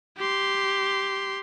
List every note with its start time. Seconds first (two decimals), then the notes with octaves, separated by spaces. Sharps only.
0.17 G4 C6